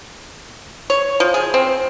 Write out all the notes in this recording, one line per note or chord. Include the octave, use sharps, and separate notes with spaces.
C#5
F3
G#4
C4